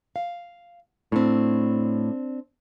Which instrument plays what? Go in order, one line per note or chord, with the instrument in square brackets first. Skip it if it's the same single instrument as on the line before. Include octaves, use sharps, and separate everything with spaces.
[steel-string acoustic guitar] F5
[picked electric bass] A2 [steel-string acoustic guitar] C4 D4